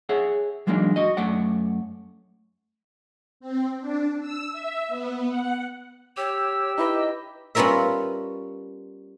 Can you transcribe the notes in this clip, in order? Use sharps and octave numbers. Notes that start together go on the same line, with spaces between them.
G#4 C#5 E5 F#5
E3 F#3 G#3 A#3 D4 D#4
F#4 D#5
F#2 A3 D5 F#5
C4
D4
E6
E5
B3
F#5
G4 C#5 E6
D#4 E4 B4 D#5
G3 B3 C#4 F4 A#4 E5